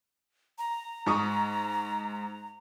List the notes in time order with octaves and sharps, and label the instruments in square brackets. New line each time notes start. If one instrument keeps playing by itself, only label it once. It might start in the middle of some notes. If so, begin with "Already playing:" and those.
[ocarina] A#5
[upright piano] G#2 C#6 D#6